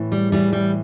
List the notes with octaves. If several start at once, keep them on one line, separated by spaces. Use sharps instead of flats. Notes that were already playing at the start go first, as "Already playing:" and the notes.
Already playing: A2 E3
G3
A2 E3 G3
G3